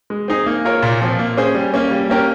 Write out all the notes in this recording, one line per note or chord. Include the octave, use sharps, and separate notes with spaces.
G#3
C4 D#4 G#4
A#3
F4 A#4 C#5
A#2
F3 C4 F4
A#3
C#4 G#4 C5
G3
A#3 C#4
G3
A#3 C#4 G4 A#4